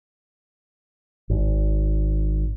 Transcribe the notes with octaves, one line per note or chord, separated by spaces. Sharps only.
G#1